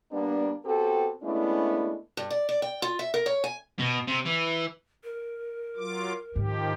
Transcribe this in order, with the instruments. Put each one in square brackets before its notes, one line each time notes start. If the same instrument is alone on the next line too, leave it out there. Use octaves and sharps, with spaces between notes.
[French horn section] G3 A#3 B3 D4
B3 C4 F#4 G4 A4
G#3 A3 B3 C#4 D4 E4
[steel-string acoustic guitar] G2
D5
D5
G5
F4
E5
A#4
C#5
G#5
[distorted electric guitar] B2
C3
E3
[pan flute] A#4
[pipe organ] F#3 F4 D6
[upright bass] G#2 [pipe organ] D#3 F3 G4